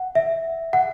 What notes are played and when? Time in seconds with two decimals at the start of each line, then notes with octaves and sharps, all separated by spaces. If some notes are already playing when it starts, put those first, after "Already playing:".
Already playing: F#5
0.15 E5
0.73 F#5